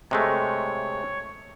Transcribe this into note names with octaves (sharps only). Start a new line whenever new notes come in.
C3 G#3 A3 C#5